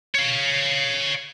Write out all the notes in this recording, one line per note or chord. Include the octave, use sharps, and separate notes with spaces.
C#5 F5